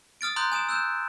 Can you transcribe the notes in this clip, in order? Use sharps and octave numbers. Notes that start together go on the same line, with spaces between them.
D#6 F6 A6 D7
A#5 C6 D#6 F#6 G6
G#5 D#6 D7 E7
E6 F#6 G6 E7